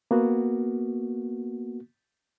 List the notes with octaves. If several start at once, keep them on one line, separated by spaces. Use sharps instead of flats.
A#3 B3 F#4